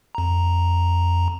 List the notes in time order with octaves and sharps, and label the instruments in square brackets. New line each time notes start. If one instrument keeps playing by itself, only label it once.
[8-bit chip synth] F2 A#5